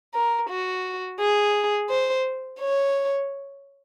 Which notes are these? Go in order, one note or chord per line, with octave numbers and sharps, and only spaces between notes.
A#4
F#4
G#4
C5
C#5